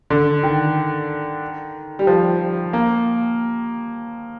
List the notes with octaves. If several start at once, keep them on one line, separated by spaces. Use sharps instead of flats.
D3
D#3
G3
F3
A#3